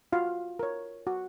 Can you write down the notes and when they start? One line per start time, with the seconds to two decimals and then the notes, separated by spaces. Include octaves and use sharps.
0.13 F4 F#4 F5
0.59 A#4 C#5
1.07 F#4